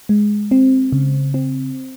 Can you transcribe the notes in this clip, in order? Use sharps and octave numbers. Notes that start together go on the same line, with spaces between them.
G#3
C4
C#3
C4